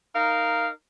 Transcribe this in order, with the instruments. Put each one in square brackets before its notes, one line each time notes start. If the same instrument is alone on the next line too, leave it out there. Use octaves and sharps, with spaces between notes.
[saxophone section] D#4 A#4 F5